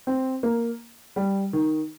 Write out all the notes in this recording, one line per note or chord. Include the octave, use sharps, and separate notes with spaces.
C4
A#3
G3
D#3